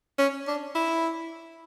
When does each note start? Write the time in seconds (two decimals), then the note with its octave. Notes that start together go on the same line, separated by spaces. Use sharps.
0.19 C#4
0.48 D4
0.75 E4